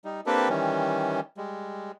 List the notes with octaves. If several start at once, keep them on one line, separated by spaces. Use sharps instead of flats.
G3 D#4
A#3 C4 D4 G4 A4 B4
D#3 E3 G3 C#4
G3 G#3